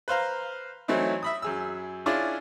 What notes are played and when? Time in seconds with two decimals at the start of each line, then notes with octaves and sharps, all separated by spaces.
0.08 B4 C5 F5 A#5
0.88 E3 F#3 A3 C4 D#4 E4
1.23 E5 B5 D#6
1.42 F#2 G#4 E6
2.06 C#4 D4 E4 F4 G#4 D5